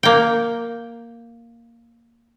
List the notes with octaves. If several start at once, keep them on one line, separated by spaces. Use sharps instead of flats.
A#3 G5